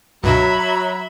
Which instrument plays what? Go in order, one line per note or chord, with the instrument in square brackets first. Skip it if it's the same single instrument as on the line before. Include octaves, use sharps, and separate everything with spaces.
[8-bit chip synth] C#2 G2 B2 [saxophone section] F#3 [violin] E5 B5 [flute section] A#5